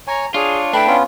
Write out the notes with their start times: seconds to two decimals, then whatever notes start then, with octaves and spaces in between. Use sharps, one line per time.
0.08 C#5 G#5 A#5
0.34 D4 F4 G#4 C#5
0.73 A3 D4 E4 B4 G5
0.88 B3 C#4 F4